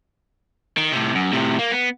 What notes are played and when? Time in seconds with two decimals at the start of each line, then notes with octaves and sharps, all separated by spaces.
0.77 D#3
0.92 A2 C3
1.15 F#2
1.33 A2 C3
1.59 A#3
1.72 B3